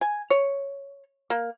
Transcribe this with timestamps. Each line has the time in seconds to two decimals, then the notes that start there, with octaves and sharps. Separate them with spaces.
0.01 G#5
0.30 C#5
1.30 A#3